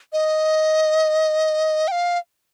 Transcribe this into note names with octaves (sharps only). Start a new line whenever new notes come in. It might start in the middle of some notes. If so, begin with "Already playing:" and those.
D#5
G5
F5